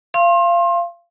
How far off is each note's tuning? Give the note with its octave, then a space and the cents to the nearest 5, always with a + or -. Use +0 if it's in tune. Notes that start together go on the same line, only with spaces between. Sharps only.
F5 -25 C6 +30